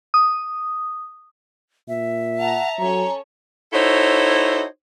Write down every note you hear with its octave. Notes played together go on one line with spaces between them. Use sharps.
D#6
A#2 E5
F#5 A5 A#5
F#3 C#4 A4 C#5 A#5
D#4 E4 F#4 A4 C5 C#5